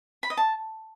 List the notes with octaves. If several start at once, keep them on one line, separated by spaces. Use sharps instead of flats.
B5
D#5
A5